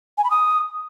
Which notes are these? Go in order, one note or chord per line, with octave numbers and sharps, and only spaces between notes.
G#5
B5
D#6